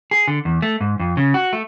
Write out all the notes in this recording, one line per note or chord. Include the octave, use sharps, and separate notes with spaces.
G#4
D3
E2
A3
G#2
F2
C#3
F#4
A3